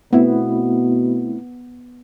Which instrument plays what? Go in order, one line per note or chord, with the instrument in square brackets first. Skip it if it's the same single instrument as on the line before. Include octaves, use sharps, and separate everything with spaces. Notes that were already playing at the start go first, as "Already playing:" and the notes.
[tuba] B2 [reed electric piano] A3 C4 E4 [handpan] B3